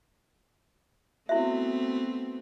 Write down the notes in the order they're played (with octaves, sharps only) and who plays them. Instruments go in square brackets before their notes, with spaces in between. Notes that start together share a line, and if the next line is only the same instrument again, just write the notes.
[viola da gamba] A3 B3 C4 [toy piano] E4 E5 [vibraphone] F#4